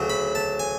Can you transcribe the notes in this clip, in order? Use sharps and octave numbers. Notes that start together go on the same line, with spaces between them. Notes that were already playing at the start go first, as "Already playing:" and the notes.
Already playing: D2 C#3 F#3
B5
A5
G#5